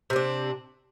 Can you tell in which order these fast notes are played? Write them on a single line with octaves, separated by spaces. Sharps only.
C3 C4 D4